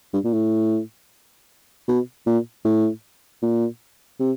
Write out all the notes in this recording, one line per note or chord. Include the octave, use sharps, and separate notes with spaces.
G2
A#2
A2
B2
A#2
A2
A#2
C3